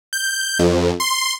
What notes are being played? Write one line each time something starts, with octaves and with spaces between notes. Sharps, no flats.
G6
F2
C6